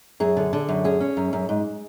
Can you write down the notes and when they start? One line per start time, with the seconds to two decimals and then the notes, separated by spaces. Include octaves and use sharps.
0.20 F#2 G#4
0.37 D3
0.53 D3
0.69 F#2
0.84 C#4 G#4
1.00 C#4
1.17 F#2
1.33 F#2
1.49 G#2